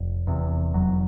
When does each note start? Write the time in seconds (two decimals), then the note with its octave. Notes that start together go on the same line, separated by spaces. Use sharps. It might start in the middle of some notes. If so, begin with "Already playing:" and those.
Already playing: F1
0.27 E2 C3
0.74 F1 F#3